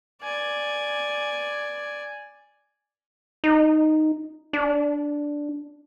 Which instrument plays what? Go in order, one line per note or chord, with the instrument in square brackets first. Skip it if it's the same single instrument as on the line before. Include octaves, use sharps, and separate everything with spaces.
[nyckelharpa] D5 G#5
[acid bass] D#4
D4